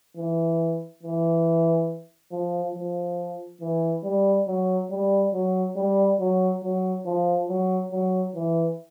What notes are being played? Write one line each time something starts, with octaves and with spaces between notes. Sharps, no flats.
E3
E3
F3
F3
E3
G3
F#3
G3
F#3
G3
F#3
F#3
F3
F#3
F#3
E3